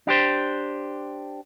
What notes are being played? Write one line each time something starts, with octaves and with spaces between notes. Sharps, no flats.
D4 G4 C5